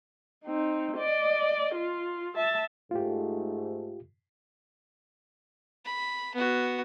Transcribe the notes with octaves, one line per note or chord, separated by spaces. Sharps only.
C4 D#4
D5 D#5
F4
E5 A5
G#2 A3 F4 G4
B5
B3 F#4